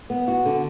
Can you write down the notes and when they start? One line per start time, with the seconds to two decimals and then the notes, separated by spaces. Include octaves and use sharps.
0.10 B3
0.28 F#4
0.45 D3